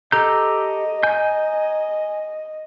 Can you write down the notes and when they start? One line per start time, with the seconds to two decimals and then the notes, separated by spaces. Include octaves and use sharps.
0.12 G4 A4 D#5 A#5 G6
1.03 G#5 G6